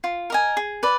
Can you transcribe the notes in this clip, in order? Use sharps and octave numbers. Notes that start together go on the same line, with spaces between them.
F4
A#4 D#5 G#5
G#4
B4 D5